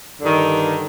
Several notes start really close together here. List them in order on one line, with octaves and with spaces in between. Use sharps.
D3 G2 D#3